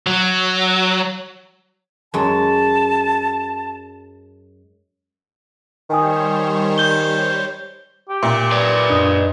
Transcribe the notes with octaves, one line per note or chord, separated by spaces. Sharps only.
F#3
F#2 G#3 A5
D#3 G3 C5 C#5 G5 G#5 D#6
G6 G7
G4
A#2 E5
B4 D5
F#2 D4 D#5